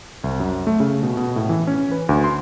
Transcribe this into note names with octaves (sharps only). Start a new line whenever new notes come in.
C2
F#2
A3
C#3
B2
B2
A2
E3
C#4
B4
D2
C6